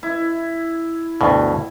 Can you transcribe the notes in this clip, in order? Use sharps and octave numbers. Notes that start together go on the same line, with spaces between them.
E4
D2 G2 B2